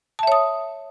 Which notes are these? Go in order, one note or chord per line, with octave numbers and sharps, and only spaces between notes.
C#5 E5 A5 D#6